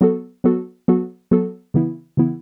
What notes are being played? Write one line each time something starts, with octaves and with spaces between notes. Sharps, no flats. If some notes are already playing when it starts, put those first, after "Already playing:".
F#3 B3 F#4 A4
F#3 B3 F#4 A4
F#3 B3 F#4 A4
F#3 B3 F#4 A4
C#3 E3 B3 E4
C#3 E3 B3 E4